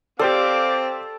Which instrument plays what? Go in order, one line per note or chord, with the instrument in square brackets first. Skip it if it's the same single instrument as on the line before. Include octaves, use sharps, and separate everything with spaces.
[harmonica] C4 [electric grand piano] G4 C5 D5 [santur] A4 [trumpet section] F5 D6